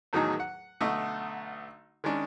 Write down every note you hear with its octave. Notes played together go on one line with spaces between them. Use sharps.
E2 A2 D#3 F#3 D#4 G#4
F#5
B1 D3 A3 D#5 C#6
D#3 G#3 C#4 D4